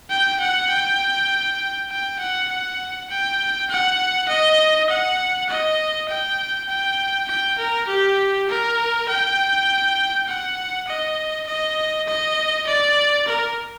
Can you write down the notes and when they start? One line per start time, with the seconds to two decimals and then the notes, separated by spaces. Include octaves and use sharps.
0.10 G5
0.40 F#5
0.70 G5
1.90 G5
2.19 F#5
2.49 F#5
3.10 G5
3.69 F#5
4.28 D#5
4.89 F#5
5.49 D#5
6.09 G5
6.69 G5
7.28 G5
7.58 A#4
7.88 G4
8.49 A#4
9.09 G5
10.28 F#5
10.88 D#5
11.47 D#5
12.07 D#5
12.67 D5
13.28 A#4